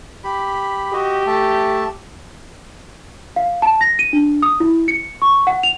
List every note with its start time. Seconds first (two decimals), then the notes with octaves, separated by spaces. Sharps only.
0.24 G4 B5
0.93 F#4 G4 D#5
1.27 A3 E5 A5
3.36 F5
3.62 A5
3.81 A#6
3.99 D#7
4.13 D4
4.42 D#6
4.60 E4
4.88 C#7
5.22 C#6
5.47 F#5
5.63 F7